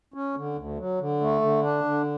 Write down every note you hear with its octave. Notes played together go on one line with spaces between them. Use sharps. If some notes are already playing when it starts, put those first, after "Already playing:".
C#4
D3
D2
F#3
D3
A3
D3
D4
D3